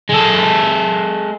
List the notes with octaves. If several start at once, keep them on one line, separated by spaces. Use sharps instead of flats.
G#3 A4